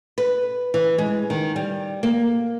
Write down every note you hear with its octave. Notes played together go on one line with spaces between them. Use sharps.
B4
E3
G#3
D#3
G3
A#3